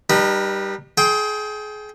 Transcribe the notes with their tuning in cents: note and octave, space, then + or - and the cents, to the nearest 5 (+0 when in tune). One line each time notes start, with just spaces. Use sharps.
G3 +0 D#4 -40 B4 -40
G#4 +30 G5 +0 C6 +5